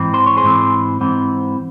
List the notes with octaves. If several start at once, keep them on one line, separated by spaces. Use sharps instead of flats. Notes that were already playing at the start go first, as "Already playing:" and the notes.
Already playing: G#2 E3 C4
C5
C#5
G#4 C5
G#2 E3 C4
G#2 E3 C4